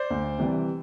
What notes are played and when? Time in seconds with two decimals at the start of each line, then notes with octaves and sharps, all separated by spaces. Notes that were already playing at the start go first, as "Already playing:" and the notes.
Already playing: C5 D5
0.10 D2
0.38 C3 E3 G3